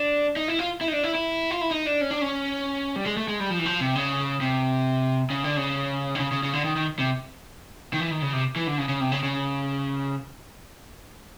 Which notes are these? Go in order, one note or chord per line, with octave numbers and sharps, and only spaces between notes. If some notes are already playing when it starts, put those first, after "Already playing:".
Already playing: D4
D#4
E4
F4
E4
D#4
D4
E4
E4
F4
E4
D#4
D4
C#4
D4
C#4
G3
G#3
A3
G#3
G3
F3
E3
F3
C3
C#3
C3
C#3
D3
C#3
D3
C#3
C#3
C#3
D3
D#3
D#3
C3
D#3
E3
D#3
C#3
C3
E3
D3
C#3
C#3
C3
C#3
C#3